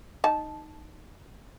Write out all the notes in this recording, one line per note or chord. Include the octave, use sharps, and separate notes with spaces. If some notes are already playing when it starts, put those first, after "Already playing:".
D#4 A5